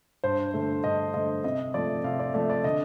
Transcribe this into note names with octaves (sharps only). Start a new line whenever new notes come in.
G2 C5
D3 A3
G2 D#5
D3 A3 D#5
C3 D#5
F3 A3 D5
C3 F5
D5
F3 A3 D5
D5
D3 D#5